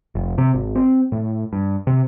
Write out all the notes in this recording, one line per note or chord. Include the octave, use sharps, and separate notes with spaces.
F1
C3
G#1
C4
A2
G2
C3